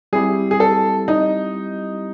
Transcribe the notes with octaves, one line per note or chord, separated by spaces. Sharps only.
G3 C4 E4 G4 G#4
G#4
A4
D#4